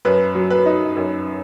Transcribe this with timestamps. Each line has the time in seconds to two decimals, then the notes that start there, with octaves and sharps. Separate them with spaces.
0.05 F#2 B4
0.35 F#3
0.50 B4
0.66 D#4
0.96 F#2